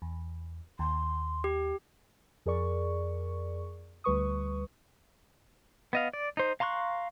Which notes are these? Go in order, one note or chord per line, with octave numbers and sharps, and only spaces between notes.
E2
D#2 C6
G4
F2 G#4 A#4 D5 C#6
D2 G3 B4 C#6 D#6
B3 D#5 F5
D5
D#4 C5
F5 A#5 C6 C#6 F#6